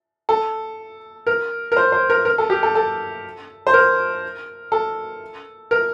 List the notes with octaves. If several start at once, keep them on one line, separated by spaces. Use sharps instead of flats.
A4
A#4
A#4
C5
C5
A#4
A#4
A4
G4
A4
A4
C5
A#4
A4
A#4